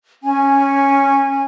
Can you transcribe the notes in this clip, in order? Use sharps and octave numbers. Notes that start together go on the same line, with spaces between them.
C#4 G#5